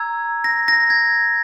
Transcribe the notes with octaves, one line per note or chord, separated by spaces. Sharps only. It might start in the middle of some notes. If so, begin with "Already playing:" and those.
Already playing: A#5 E6 G#6
A#6
A#6
G#6